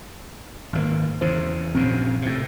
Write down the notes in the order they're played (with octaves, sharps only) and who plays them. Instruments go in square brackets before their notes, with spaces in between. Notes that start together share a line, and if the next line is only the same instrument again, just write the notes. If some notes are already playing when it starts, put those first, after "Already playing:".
[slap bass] G#1 D3 A#3
[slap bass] E2 C#3 [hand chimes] C5
[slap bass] A#1 F#2 C#3 [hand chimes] C4
[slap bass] A2 C3